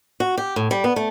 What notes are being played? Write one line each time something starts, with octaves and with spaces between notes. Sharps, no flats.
F#4
G4
A2
G3
B3
A3